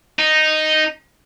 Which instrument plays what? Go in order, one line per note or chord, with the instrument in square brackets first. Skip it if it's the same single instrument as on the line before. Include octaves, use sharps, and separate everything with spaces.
[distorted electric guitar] D#4